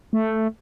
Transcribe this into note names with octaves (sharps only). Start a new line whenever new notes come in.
A3